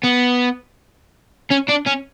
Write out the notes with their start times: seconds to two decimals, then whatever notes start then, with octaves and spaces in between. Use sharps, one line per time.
0.04 B3
1.51 C#4
1.69 D4
1.87 C#4